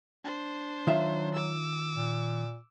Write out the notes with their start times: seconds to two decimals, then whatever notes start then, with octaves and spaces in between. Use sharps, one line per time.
0.24 D4 C5
0.87 D#3 F#3 F4 E5
1.34 D6 E6
1.95 A#2